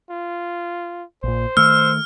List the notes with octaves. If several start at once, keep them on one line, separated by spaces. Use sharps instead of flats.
F4
A#1 A#2 C5
D#3 A3 E6 F6